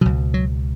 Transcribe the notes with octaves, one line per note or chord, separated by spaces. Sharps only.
C#2 B2 F#3
F#3